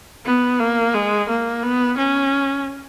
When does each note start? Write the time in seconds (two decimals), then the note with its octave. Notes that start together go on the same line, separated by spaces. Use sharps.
0.26 B3
0.60 A#3
0.94 G#3
1.29 A#3
1.63 B3
1.98 C#4